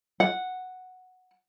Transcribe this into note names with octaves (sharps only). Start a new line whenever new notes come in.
F#5